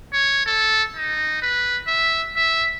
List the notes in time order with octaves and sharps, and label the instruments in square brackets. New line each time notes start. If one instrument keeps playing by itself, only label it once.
[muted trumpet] C#5
A4
D#4
B4
E5
E5